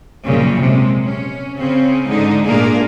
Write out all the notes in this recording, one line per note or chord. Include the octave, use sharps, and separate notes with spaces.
F#2 A#2 C#3 F3 G3
C3 G#3
C#4
C#3 C4 C#4
G#2 D3 G#3 D#4
A#2 A3 A#3 D4 G#4 A#4